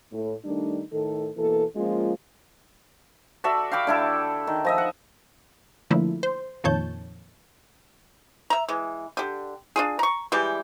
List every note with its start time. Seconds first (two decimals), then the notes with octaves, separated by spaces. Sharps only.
0.12 A2
0.45 D#3 G3 A3 D4 D#4
0.92 A2 D#3 A4
1.37 B2 E3 A#3 A4
1.76 F3 G#3 A#3 C#4 F4
3.44 F#4 A4 D5 E5
3.71 F5 G5 B5 D6
3.87 D3 E4 A4
4.47 D#3
4.65 F3 D#5 E5
4.78 F#5
5.91 D3 F3 A3 A#3 E4
6.23 C5
6.64 F2 A#2 D#3 C#5 A5 G6
8.50 E5 A#5
8.69 E3 G#3
9.17 D3 G4
9.76 D4 F4 G#4
9.99 A#5 C#6
10.32 E3 G3 G#3 G4